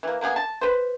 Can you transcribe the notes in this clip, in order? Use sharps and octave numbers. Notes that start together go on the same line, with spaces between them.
E3 A#3
A#3 B3 G4 G#4
A5
B4 C5